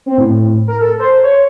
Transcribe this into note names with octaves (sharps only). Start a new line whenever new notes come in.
C4
A2
A#4
A4
C5
C#5